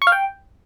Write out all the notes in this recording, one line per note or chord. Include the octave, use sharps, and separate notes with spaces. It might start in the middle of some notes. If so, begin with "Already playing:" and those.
C#6
F5
G5